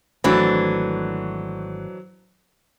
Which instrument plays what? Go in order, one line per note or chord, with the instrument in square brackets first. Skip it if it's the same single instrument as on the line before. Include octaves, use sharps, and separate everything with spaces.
[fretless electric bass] G#1 A3 [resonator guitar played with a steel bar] E3 D4 [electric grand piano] F#3 F#4 C5